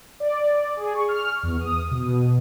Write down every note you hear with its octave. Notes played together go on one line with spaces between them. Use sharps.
D5
G#4
C#6
F6
E2
D#6
B2